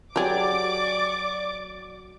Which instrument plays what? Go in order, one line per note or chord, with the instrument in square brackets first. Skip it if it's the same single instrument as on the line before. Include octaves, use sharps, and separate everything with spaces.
[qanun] F#3 [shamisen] G4 G#4 [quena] D5 [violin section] D6